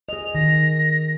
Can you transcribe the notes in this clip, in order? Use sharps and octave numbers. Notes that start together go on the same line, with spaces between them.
G#4 D#5 F7
D#3 A#6